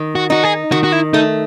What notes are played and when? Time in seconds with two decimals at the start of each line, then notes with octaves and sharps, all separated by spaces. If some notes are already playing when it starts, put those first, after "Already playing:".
Already playing: D#3
0.15 F#4
0.30 D#4 F#4
0.43 G#4
0.72 D#3 F#4
0.84 F#4
0.92 E4
1.13 A3 D#4